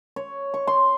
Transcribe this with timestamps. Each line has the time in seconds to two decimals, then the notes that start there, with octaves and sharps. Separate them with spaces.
0.16 C#5
0.54 C#6
0.67 C6